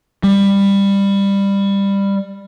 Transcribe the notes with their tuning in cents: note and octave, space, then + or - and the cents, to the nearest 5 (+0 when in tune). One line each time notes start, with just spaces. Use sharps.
G3 +15